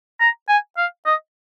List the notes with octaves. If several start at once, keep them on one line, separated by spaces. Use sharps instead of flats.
A#5
G#5
F5
D#5